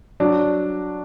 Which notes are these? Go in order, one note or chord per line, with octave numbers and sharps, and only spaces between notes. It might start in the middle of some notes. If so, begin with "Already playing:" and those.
F#3 D4